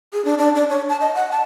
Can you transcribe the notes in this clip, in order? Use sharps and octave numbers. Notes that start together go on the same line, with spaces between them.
G#4
D4
D4
D4
C#5
A5
D#5
F#5
A5